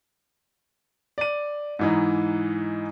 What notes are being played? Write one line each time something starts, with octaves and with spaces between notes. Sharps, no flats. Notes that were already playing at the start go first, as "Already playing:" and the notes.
D5 D#7
G#2 E3 D#4